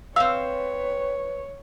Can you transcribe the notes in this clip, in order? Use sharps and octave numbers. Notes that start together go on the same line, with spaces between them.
C4 B4 C#5 F5 E6